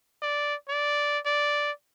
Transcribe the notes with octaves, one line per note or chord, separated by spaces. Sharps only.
D5
D5
D5